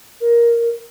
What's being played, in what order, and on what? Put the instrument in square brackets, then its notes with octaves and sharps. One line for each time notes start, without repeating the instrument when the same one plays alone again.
[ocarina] A#4